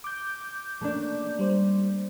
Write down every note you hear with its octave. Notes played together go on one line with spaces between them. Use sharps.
D6 G6
A3 A#3 D4
G3 C5